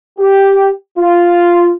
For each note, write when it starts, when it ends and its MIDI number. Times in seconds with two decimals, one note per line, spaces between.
0.19 0.69 67
0.98 1.72 65